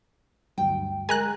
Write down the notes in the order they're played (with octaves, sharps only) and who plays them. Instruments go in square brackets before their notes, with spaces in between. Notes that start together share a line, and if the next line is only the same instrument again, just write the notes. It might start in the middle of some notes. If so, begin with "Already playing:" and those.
[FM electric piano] D2 G2 F#3 [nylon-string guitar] G5
[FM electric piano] G#3 A#4 [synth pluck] G#5 A#5 F#6